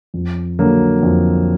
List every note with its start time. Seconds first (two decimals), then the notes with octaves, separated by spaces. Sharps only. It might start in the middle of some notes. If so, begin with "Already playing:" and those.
0.14 F2
0.59 D3 F#3 A#3
1.03 F2